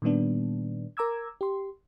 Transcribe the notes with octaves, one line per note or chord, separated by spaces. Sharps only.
A#2 D#3 G3 B3 D4
A#4 A#5 D6 E6 G#6
G4 C6